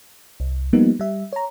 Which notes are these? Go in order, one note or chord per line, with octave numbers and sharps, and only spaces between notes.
C2
F3 G3 A#3 B3 D#4
G3 E5
C#5 A#5